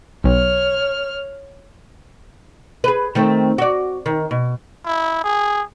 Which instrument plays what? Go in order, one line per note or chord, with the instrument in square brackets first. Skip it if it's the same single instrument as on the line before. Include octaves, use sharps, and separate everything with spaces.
[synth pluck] B1 B2 [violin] C#5 F6
[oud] G#4 B4
D#3 A3 C4
F#4 D5
D#3
B2
[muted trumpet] E4
G#4